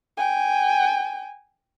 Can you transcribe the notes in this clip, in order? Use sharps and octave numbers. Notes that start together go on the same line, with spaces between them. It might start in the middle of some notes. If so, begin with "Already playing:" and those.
G5 G#5